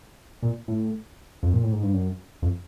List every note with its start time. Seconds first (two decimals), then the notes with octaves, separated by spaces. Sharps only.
0.42 A#2
0.68 A2
1.43 F2
1.53 A#2
1.63 A2
1.73 G#2
1.83 G2
1.93 F#2
2.42 F2